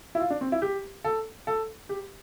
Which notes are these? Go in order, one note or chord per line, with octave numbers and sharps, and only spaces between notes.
E4
F4
D4
C4
E4
G4
A4
A4
G4